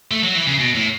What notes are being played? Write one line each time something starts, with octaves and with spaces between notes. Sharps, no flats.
A3
F#3
E3
C#3
B2
A2